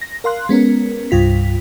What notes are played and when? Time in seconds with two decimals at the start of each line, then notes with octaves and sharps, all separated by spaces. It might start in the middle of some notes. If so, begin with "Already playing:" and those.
0.01 A#6
0.24 A#4 F5 C6 F#6
0.49 G#3 B3 C#4 A#4
1.11 C2 G2 F4 B6